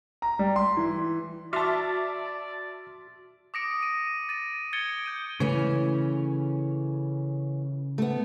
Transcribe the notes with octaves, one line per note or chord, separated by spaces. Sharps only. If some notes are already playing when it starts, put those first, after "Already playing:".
A#5
G3
C6
E3
F#4 D5 E5 A5 C6 D6 F6
D6 D#6 A#6 C#7 D7
D#7
A6 D#7
G#6 A6 C#7 D7 G7
G6 D#7
C#3 E3 A3 C#4
A3 B3